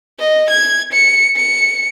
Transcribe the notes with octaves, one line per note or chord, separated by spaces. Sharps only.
D#5
G#6
C#7
C#7